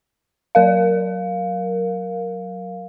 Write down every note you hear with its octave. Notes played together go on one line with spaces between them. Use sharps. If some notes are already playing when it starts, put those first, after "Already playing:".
F#3 A#4 F5